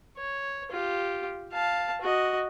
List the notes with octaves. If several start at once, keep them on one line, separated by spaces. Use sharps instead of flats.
C#5
F4 G4
F5 A5
F#4 D#5